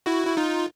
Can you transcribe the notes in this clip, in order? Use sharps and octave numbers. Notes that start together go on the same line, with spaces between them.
E4 F#4
E4
D#4 F4